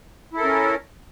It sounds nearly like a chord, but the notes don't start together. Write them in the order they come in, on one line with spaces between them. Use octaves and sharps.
E4 A4 A#4 C#4